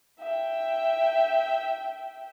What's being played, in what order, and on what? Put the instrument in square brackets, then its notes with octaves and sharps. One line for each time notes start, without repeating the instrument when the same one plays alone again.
[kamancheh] E5 G5